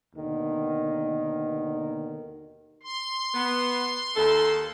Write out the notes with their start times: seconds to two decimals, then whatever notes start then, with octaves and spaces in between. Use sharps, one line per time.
0.16 D#2 B2 D3 D#3
2.83 C6
3.34 B3
4.16 D#2 A4